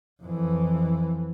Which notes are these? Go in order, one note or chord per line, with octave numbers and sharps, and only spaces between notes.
F2 E3